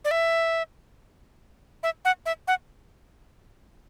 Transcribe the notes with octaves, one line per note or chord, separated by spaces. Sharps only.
D5
E5
E5
F#5
E5
F#5